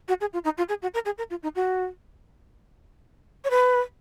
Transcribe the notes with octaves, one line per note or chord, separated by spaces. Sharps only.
F#4
G#4
F4
D#4
F4
G#4
F#4
A#4
G#4
A#4
F4
D#4
F#4
C#5
B4